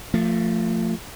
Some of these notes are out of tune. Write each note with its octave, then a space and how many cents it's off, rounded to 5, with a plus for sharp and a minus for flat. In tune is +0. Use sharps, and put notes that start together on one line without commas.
F3 +0 A3 +30